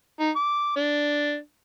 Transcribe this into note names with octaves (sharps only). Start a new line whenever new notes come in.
D#4
D6
D4